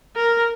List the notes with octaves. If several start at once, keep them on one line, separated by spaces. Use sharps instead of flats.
A#4